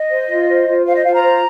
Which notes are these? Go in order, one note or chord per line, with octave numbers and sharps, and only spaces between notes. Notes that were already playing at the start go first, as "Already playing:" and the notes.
Already playing: D#5
C5
F4
C5
F4
C5 F5
D#5
F4 F5
A#5
C5